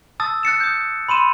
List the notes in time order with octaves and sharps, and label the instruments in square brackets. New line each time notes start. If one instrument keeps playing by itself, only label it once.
[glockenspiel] A5 D#6 E6 A6
F#6 A6 C#7 E7
D#6 G6
B5 C6 D#7 E7